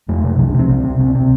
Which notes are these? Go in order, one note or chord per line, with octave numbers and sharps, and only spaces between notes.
F2 A3
C3
C2 F3
D4
C3 C4
C2 C4
C3
C2 C4
C3 C4